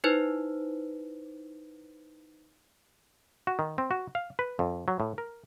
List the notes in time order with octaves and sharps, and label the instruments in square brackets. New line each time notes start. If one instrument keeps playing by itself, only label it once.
[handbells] D#4 E4 B4 C5
[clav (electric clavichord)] F#4
D#3
C4
F#4
F5
B4
F2
F#3
A2
A#4